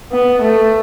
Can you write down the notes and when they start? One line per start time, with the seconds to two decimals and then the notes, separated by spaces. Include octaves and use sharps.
0.12 B3
0.41 A3